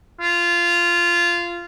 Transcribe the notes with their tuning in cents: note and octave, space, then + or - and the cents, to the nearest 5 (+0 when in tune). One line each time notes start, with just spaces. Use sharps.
F4 -15